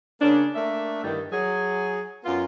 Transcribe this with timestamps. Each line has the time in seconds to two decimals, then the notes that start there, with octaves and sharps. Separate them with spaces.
0.21 C#3 A#3 C#4 D4
0.54 A3 A#3 D4 E5
1.03 G2 D3 D#3 G3 E4
1.31 F#3 G#4
2.24 F#2 B3 F4